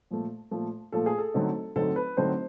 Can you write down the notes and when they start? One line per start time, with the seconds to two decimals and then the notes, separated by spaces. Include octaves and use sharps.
0.11 A#2 F3 A3
0.51 A#2 F3 A3
0.92 A#2 F3 A3 A4
1.06 G#4
1.18 A4
1.34 D3 F#3 A3 C4 D#4
1.76 D3 F#3 A3 C4 D#4 A4
1.96 B4
2.17 D3 F#3 A3 C4 D#4 C5